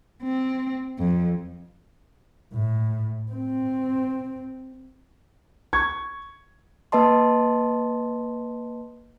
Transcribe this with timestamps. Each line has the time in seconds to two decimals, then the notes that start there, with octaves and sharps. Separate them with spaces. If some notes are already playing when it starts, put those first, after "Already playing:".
0.23 C4
0.98 F2
2.53 A2
3.32 C4
5.73 C#6 G#6
6.92 A#3 B4 D#5 A5 C6